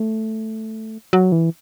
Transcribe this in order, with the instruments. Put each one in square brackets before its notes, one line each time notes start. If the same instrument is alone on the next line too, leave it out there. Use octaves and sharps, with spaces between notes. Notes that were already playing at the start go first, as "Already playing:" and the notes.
Already playing: [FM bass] A3
F#3
E3